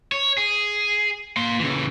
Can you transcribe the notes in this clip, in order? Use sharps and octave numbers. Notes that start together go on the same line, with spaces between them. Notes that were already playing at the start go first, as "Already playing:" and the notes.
C#5
G#4
A#3 C6
C#3 E3